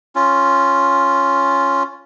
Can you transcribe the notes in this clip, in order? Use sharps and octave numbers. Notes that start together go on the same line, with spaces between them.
C#4 F4